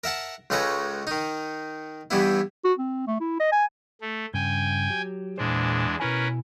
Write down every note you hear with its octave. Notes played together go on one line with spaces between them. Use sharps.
A#4 E5 F#5 A5
C#2 C#3 G#3 A4 B4 A#5
D#3 D#4
G2 E3 G3 B3 E4
F#4
C4
A3
E4
D#5
G#5
A3
G2 C#3 G5 G#5
F#3 G4
E2 A#2 G#3 D4 C5
B2 C#4 E4 A#4 B4 G#5